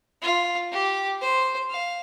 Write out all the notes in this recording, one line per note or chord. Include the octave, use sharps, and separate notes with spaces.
F4
G4
C5
F5